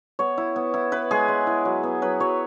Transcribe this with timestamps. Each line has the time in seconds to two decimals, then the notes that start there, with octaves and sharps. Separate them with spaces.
0.19 B3 C#5
0.38 E4
0.56 B3
0.74 E4
0.92 E4 B4
1.11 G#3 G#4
1.28 G#3
1.47 E4
1.65 F#3
1.83 B3
2.02 F#3 B4
2.20 F#3 C#5